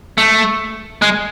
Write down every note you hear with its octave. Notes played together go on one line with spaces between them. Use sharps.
A3
G#3